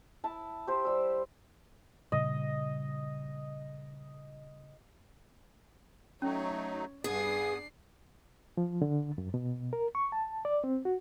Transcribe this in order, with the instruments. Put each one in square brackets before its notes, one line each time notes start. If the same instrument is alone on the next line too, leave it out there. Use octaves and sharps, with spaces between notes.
[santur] E4 A5
G4 C5
G3 E6
[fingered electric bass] A#2 C#3 G3 [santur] D#5
[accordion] F#3 A3 D#4 [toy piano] C#4 [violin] C#5
[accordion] G2 B3 D#6 [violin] D4 C7 [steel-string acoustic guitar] G#4
[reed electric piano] F3
D3
F#2
B2
A#4
C#6
A5
D5
C4
F#4